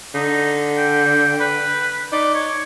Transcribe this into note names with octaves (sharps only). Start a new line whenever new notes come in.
D3 D#4
G5
B4
D#4 D5
C#5